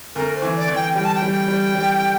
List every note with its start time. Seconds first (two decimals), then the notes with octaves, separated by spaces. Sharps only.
0.15 D2 A#4
0.35 C5
0.42 E3
0.56 D5
0.68 E3
0.76 G5
0.95 G3 G5
1.05 A5
1.15 G5
1.22 G3
1.48 G3
1.75 G3